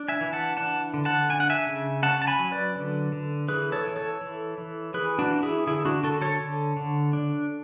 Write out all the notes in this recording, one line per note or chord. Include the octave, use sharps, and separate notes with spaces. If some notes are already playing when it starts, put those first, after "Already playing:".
Already playing: D4
E5 G#5
E3
F#5 A5
D4 F#5 A5
D3
F#5 A5
D4 G#5
F#5
E5 G#5
C#3
C#4 F#5 A5
A5
G#5 B5
F#3
B4 D5
D3
D3
E3 G#4 B4
A4 C#5
E3
A4 C#5
E3
E3
E3 G#4 B4
D4 F#4
E3
E4 G#4
D3 E4 G#4
D4 F#4
D3 F#4 A4
A4 C#5
D3
D3
D4